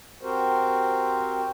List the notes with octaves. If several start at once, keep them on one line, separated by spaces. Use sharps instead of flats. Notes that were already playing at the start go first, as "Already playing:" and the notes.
C4 F#4 G4 A#4 C5